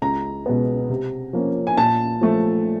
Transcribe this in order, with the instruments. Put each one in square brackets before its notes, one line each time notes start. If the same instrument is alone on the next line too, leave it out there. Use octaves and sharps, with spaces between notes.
[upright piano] C#2 A#5
B2 G#3 B3
C3
F3 A#3 C#4
G#5
A#2 A5
F3 A3